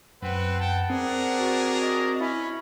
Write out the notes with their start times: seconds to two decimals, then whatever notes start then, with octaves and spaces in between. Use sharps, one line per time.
0.22 F#2 C4 B4 F#5
0.60 G5 A5
0.90 C4 D4 G#4 A#4
1.39 F#4
1.81 D#5
2.20 C#4 E4 B5